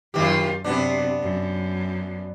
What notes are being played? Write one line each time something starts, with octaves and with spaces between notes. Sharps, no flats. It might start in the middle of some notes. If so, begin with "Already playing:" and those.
F#2 D#3 F4 G4
F#2 C3 B3 D4
F#2